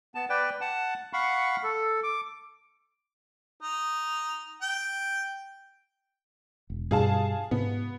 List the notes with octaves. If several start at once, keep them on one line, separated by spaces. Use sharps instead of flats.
B3 A5
B4 D5 G5
F#5 A5
F5 F#5 B5 C#6
A4
D6
D#4
G5
E1
G2 B2 G3 G#4 F5 A5
G#2 C3 B3